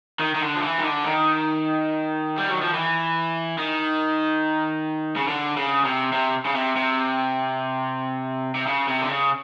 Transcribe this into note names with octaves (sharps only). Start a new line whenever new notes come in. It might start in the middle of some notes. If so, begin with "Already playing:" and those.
D#3
D#3
D3
F3
E3
D#3
D3
D#3
G3
F#3
F3
E3
D#3
C#3
D3
C#3
C3
C3
C#3
C3
C3
C3
C#3
C3
D3
C#3